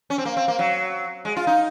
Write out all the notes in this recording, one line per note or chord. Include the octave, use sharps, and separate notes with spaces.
C#4
C4
A#3
C4
A#3
F#3
G#3
F4
D#4